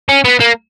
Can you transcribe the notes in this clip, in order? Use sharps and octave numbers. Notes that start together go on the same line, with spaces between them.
C#4
B3
A#3